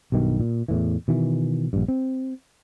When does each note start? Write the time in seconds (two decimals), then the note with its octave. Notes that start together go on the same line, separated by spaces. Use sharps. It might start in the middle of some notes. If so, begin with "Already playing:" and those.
0.12 B1 G2 B2 D#3
0.40 A#2
0.68 E2 A2 E3
1.08 B2 D#3 E3
1.73 A#1 G2
1.88 C4